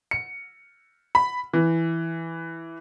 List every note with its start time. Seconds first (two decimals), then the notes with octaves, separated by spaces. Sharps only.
0.11 C#7
1.15 B5
1.53 E3